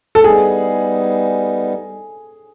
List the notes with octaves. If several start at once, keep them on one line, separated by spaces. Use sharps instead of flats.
A4
G3 B3 D#4 G#4